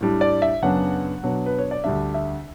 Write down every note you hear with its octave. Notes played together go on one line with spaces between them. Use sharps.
A2 G3 D4
D5
E5
F#2 C#3 F#3 B3 D4 F#5
B2 F#3 B3 D4
B4
C#5
D5
D2 D3 G3 D4 E5
E5